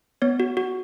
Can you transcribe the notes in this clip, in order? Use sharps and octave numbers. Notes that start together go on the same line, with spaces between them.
B3 C#5
F#4
F#4